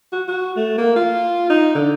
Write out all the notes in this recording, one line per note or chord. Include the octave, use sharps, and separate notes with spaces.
F#4
F#4
A3
A#3
F4
D#4
D3